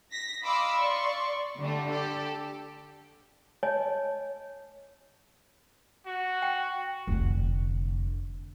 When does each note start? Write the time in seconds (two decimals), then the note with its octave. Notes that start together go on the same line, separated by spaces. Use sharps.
0.12 A#6 B6
0.44 D#5 F5 B5 C6 D6 E6
0.76 D5 C6 C#6
1.60 D3 G3 A3
1.91 G4 A4
3.63 C#5 D#5 G#5 A5
6.06 F#4
6.42 G5
7.07 F1 D3